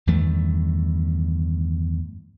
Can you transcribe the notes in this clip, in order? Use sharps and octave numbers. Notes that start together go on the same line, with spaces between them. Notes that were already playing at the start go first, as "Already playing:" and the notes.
E2 G2 D#3 A3